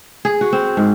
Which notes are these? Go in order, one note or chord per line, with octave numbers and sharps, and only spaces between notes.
G#4
F#4
C4
G#2